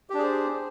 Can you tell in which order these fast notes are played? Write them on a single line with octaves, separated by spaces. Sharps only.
G4 D4 G#4 C5